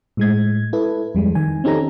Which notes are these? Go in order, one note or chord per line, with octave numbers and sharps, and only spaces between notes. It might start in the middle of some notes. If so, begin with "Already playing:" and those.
A2 G#3 G#6
E4 A4 B4
F2 G3 G#3
D#3 G#5
C4 C#4 D#4 G4 A4 A#5